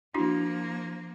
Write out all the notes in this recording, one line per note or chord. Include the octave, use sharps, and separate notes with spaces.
F3 A#3 D4 E4 F#4